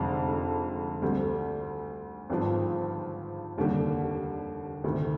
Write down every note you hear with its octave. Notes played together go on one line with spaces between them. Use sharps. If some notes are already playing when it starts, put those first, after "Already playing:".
Already playing: F1 F2 D3 G#3
D2 D3 G3 C4
G#1 G2 F3
F1 D#2 D3 G3
D2 C3 D#3